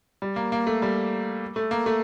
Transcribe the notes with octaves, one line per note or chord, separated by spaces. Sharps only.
G3
A#3
A#3
A3
G3
A3
A#3
A3